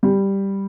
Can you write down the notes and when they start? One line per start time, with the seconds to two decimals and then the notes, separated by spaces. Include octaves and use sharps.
0.03 G3